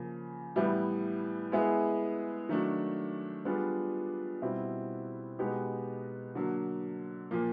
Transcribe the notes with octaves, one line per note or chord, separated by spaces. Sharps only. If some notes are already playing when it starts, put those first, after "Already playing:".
Already playing: C#3 F3 A#3
A2 E3 G3 B3 E4
G#3 B3 E4 G#4
D#3 F#3 A3 D4
G3 B3 D4 F4 G#4
B2 G3 C4 E4
B2 G#3 B3 D#4 G4
D3 F#3 A#3
A#2 F3 A#3